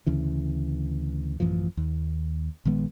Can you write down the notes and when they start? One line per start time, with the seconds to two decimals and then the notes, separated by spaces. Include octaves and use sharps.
0.06 D2 C#3 E3
1.40 A1 F#2 E3 F3
1.77 D#2
2.65 A#1 D#3 G#3 B3